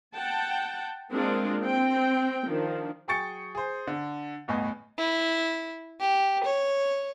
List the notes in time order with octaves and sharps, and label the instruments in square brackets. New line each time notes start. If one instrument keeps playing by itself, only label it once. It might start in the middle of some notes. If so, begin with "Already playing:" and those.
[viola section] F#5 G5 A5
G#3 A#3 C4 D4 F4 A#4
C4 G5
D#3 F3 D4
[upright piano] F#3 G#4 G5 C#6 A6 C#7
G#4 C5
D3
G1 E2 A2 B3 D#5 G#5
[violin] E4
G4
C#5